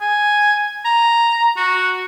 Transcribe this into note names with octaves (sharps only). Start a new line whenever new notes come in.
G#5
A#5
F#4